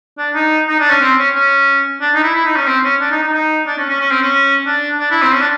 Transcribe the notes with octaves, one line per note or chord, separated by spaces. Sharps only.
D4
D#4
D#4
D4
C#4
C4
C#4
C#4
D4
D#4
E4
E4
D#4
C#4
C4
C#4
D4
D#4
D#4
D#4
D4
C#4
C#4
C#4
C4
C#4
D4
D4
E4
C4
C#4
D4